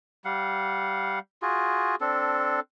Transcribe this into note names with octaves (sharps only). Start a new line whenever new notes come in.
G3 F5 F#5
F4 F#4 G#4
C4 D4 A4